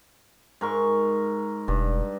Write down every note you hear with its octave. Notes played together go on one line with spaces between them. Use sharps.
G#2 A#4 C#6
E1 G2